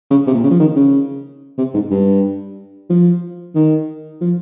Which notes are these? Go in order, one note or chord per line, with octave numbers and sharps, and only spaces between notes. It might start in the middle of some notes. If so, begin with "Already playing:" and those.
C#3
C3
A#2
C#3
F3
D#3
C#3
C3
G#2
G2
F3
D#3
F3